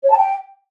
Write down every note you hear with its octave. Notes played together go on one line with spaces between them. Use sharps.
C#5
A5
G5